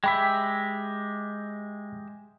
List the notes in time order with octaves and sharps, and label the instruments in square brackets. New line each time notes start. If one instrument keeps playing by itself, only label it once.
[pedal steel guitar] G#3 G4 E5 [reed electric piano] G5 B5